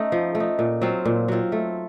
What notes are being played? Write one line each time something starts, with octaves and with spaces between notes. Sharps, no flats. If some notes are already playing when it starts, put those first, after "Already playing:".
Already playing: A3 C#4 D#4
F3
A3
D#4
A#2
F#3 C4 F4
A#2
F#3 C4 F4
A3